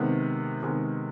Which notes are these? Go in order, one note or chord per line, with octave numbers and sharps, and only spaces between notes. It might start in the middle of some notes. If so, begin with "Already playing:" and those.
Already playing: C3 D#3 G#3 B3
C3 D#3 G#3 B3